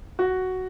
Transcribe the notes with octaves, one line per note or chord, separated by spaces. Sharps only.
F#4